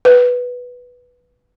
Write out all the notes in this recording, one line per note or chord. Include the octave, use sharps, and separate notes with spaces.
B4